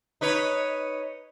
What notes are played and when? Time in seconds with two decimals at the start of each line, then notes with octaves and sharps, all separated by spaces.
0.21 D#4 B4 C#5